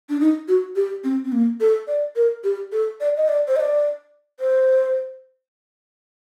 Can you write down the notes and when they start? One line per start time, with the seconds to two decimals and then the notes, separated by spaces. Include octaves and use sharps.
0.10 D4
0.20 D#4
0.48 F#4
0.76 G4
1.04 C4
1.25 C4
1.32 A#3
1.60 A4
1.88 D5
2.16 A#4
2.44 G4
2.72 A4
3.01 D5
3.17 D#5
3.28 D5
3.48 C5
3.56 D#5
3.60 D5
4.40 C5